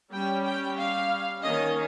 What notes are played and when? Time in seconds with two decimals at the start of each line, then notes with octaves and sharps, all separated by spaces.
0.11 G3 C#4 G5
0.44 G5
0.76 F5
1.42 D#3 A#3 C#4 D#5